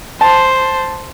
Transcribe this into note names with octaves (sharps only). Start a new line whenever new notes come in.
C5 A5